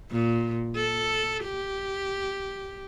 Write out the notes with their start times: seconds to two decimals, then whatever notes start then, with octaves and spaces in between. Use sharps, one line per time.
0.11 A#2
0.76 A4
1.44 G4